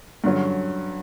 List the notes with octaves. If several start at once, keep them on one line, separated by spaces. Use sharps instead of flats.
G2 D3 F#3 C#4